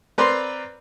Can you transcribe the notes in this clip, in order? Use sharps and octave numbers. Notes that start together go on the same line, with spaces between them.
C4 A#4 B4 D5 A#5 C6